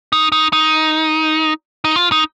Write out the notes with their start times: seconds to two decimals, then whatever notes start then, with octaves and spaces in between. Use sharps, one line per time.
0.12 D#4
0.32 D#4
0.53 D#4
1.84 D#4
1.96 F4
2.12 D#4